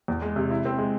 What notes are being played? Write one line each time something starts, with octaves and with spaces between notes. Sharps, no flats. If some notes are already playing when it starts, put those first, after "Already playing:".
E2
G#3
C3
E4
C4
G#3